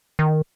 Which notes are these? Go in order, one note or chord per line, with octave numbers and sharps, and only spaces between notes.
D#3